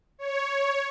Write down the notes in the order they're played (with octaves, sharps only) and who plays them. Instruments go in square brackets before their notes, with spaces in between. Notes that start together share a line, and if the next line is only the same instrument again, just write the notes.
[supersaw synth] C#5